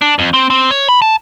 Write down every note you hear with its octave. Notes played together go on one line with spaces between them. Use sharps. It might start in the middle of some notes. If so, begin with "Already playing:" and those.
D4
F2
C4
C4
C#5
B5
A5